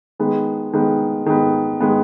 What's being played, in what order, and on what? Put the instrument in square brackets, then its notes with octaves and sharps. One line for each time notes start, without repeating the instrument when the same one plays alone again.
[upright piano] D#3 G#3 B3
D#3 G#3 B3
D#3 G#3 B3
D#3 G#3 B3